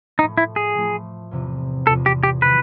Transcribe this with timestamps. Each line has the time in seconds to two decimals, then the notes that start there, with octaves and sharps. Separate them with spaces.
0.19 A2 F3 A3 D#4
0.37 E4
0.56 G#4
0.75 A2 F3 A3
1.31 E2 C3 F3
1.86 E2 C3 F3 A4
2.06 G4
2.23 G4
2.42 C3 D#3 F#3 B4